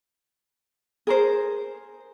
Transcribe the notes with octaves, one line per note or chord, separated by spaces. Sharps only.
G#4 A#4 C5